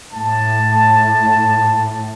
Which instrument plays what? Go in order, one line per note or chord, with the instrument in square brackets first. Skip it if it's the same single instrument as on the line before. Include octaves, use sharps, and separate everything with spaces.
[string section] A2 [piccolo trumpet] A5